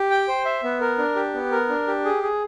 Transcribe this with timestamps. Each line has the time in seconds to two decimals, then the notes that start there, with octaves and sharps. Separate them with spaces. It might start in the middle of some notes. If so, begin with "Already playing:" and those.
Already playing: G4
0.10 G5
0.28 C5
0.45 E5
0.63 B3
0.81 A#4
0.98 D4
1.16 G4
1.34 B3
1.51 A#4
1.69 D4
1.87 G4
2.05 G#4
2.23 G#4